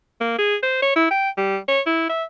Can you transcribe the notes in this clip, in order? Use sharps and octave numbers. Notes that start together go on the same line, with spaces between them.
A#3
G#4
C5
C#5
E4
G5
G3
C#5
E4
E5